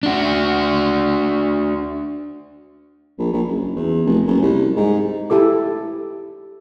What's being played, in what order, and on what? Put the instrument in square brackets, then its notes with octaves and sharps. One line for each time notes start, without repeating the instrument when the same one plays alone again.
[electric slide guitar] D4 F#4
[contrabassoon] A#1
A#1
F#1
E2
F1
F#1
C2
G#2
[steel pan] E4 G4 A4 D6